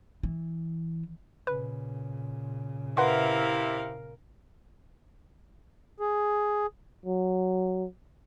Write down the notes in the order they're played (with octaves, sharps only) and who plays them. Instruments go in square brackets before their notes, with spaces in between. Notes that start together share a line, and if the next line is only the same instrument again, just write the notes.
[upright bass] E3
[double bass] A#2 C#3 [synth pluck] B4
[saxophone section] C3 E4 [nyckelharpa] A#4 F5 [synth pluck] B4 F#5 C6
[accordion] G#4
[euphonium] F#3